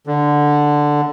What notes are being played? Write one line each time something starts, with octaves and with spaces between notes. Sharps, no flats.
D3